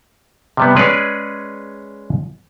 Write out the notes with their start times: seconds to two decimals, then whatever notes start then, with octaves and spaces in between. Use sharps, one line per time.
0.57 C3 G3 B3
0.76 G#3 C#4 G#4 B4 C#5 D5